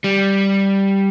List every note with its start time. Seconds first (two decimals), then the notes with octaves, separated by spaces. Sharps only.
0.04 G3